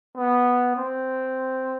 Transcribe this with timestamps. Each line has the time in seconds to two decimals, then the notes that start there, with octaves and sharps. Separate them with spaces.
0.16 B3
0.76 C4